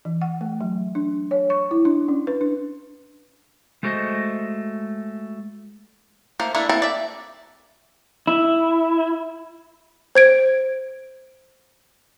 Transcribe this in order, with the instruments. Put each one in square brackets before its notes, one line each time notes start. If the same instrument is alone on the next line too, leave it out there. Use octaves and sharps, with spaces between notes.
[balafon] E3
F#5
A3
F#3
D4
C#5
C#6
E4
D4
C#4
B4
D4
[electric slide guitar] G#3 A3 F#4 A#4 C5 D#5
[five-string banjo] A3 A#3 C5
A3 A#3 D4 E4
A#3 C4 E4 A4
D5 E5
[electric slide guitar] E4
[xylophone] C5 G#6 D7